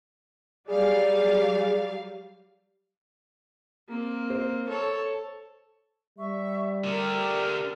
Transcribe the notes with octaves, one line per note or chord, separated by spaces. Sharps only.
F#3 G3 G#4 D5 F5
A#3 C4
C5
A4 C#5
G3 E5 C#6
D3 A3 G4 A#4 D5